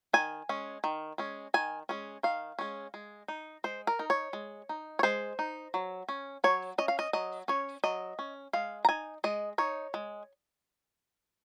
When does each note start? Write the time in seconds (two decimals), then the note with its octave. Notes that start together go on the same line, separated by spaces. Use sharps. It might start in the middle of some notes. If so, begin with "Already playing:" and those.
0.13 D#3 G#5
0.49 G#3 C#4
0.84 D#3
1.18 G#3 C#4
1.54 D#3 G#5
1.89 G#3 C#4
2.23 D#3 F5
2.59 G#3 C#4
2.94 G#3
3.28 D#4
3.64 G#3 C5
3.87 A#4
3.99 D#4
4.10 C#5
4.33 G#3
4.69 D#4
4.99 C#5
5.03 G#3 C5
5.39 D#4
5.74 F#3
6.08 C#4
6.44 F#3 C#5
6.78 C#4 D#5
6.88 F5
6.99 D#5
7.13 F#3 D#5
7.48 C#4 C#5
7.84 F#3 D#5
8.19 C#4
8.53 G#3 F5
8.85 A#5
8.89 D#4 G#5
9.24 G#3 D#5
9.58 D#4 C#5
9.94 G#3